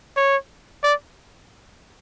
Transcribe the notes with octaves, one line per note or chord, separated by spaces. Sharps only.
C#5
D5